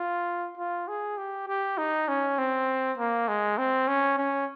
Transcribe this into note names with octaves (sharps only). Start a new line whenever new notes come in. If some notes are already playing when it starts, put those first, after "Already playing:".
Already playing: F4
F4
G#4
G4
G4
D#4
C#4
C4
A#3
G#3
C4
C#4
C#4